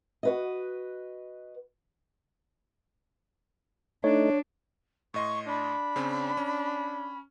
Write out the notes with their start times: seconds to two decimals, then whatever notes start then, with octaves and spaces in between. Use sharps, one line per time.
0.23 F#4 B4 D#5
4.04 A3 D4 D#4 C#5
5.14 A2 D#5 C6 C#6
5.48 D4 B5
5.96 C#3 C4 C#4
6.37 C#4